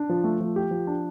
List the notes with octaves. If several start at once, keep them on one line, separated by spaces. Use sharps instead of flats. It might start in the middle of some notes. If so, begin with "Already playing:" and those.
Already playing: D4
F3
A3
F3
G4
F3
D4